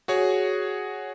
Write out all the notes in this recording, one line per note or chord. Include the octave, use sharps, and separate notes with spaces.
F#4 G#4 C#5